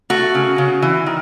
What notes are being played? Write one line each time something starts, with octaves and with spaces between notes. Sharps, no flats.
A3 F#4
C#3
C#3
E3
D#3